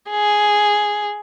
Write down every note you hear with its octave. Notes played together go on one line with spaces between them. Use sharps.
G#4